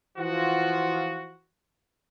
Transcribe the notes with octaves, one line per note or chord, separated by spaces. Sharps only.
E3 F3 F4 F#4